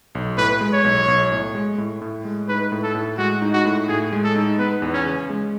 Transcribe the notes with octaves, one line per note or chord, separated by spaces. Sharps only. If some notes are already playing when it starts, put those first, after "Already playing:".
B1
A2 B4
G#3
C#5
B1
B1
A2
G#3
A2
A2
G#3
D#4 B4
A2
A4
A2
G#3 F#4
D#4
F#4
A2
A2 G#4
G#3
A4
D#4
B3 B4
E2
C#4
C#3
G#3